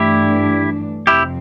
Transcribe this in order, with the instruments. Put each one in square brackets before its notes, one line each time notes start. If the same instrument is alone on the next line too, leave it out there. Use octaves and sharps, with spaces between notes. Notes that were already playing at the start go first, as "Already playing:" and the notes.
Already playing: [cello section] G2 E3 A3 D4 [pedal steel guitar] E4 G4
[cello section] F2 C3 F3 C4 [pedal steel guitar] E4 G4